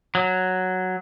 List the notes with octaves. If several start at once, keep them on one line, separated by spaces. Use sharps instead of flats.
F#3